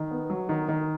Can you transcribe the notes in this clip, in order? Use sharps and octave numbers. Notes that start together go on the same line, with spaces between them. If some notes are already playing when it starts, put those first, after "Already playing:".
Already playing: D#3
B3
F#3
D#3
D#3